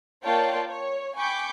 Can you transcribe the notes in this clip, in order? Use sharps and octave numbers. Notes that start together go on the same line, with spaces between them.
A#3 F4 C#5 D5 G5 A5
C#5
G5 G#5 B5 C#6 D6 G6